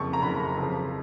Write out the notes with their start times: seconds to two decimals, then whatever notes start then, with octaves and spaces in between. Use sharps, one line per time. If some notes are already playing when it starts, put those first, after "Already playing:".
Already playing: F#1 F2 C#3 C#6
0.13 A#5
0.22 F#1 F2 C#3 B5
0.57 F2 C#3 F3